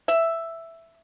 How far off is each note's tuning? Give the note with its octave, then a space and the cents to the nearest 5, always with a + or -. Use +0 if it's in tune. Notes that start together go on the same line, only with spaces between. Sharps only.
E5 +5